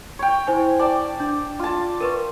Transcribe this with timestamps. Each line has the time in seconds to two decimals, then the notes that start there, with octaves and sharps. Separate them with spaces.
0.19 C#5 G5
0.47 E4 C5 G#5
0.79 D5 G5 A5
1.20 D4
1.59 F4 A5
2.00 A#4 B4 C#6